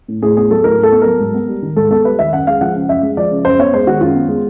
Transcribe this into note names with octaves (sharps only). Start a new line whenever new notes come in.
A2
A2 G#4
B3 G#4
F#3 A4
A2 A#4
A2
A4
B3
F#3 A#4
G#2
B3
G3
D#3
G#2 A4
B3 A4
G3 B4
D#3 E5
F#2 F#5
G#3 F5
F3 F#5
C#3
F#2 E5
G#3
F3 D5
C#3
F#2 C5
B3 C#5
G#3 C5
D#3 F#4
F#2 F4
B3
G#3